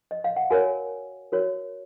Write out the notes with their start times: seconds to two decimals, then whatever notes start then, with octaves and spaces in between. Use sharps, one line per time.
0.11 D#5
0.24 F5
0.36 F#5
0.50 F#4 A#4 C#5 G#5
1.32 F#4 A#4 C#5